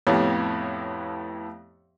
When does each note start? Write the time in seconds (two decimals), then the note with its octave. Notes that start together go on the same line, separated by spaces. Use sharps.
0.07 F2 A2 B3 G4 C#5 F5